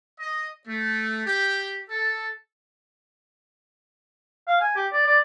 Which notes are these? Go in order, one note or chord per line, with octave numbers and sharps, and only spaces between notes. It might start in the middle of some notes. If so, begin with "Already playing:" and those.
D#5
A3
G4
A4
F5
G#5
G4
D5
D5